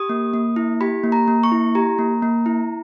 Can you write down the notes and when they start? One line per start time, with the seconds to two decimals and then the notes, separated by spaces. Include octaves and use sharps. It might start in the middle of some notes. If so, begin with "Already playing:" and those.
Already playing: G4 D#6
0.09 A#3
0.34 A#3
0.56 E4
0.81 G4 B5
1.04 A#3
1.12 A#5
1.28 A#3
1.43 C#6
1.52 E4
1.75 G4 A#5
1.98 A#3
2.22 A#3
2.46 E4